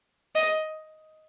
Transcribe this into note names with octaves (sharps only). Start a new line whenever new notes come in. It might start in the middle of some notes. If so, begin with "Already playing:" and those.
D#5